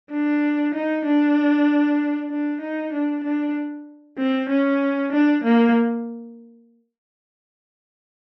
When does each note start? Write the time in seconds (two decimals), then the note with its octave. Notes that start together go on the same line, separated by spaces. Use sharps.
0.11 D4
0.74 D#4
1.04 D4
2.30 D4
2.61 D#4
2.92 D4
3.24 D4
4.18 C4
4.49 C#4
5.12 D4
5.44 A#3